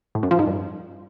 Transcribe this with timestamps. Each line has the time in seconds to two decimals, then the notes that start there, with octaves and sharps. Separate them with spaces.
0.15 A2
0.23 F#2
0.31 F3
0.39 G#2
0.47 G2